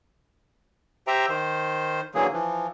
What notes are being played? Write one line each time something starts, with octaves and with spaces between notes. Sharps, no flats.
G4 C5 E5 G5 A#5
D#3 C5
D3 E3 F#3 A#3 G#4
E3 F3